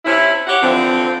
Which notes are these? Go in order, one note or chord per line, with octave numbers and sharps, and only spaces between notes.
C3 C#4 E4
G4 C#5 F#5
D3 E3 F3 C4